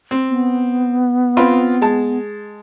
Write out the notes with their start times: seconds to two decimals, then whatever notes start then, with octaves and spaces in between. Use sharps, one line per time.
0.11 C4
0.30 B3
1.37 C4 F4 B4
1.82 G#3 A5